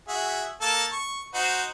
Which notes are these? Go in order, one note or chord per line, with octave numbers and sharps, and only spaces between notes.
F#4 G#4 E5
A#3 A4 A5
C#6
D#4 F#4 C5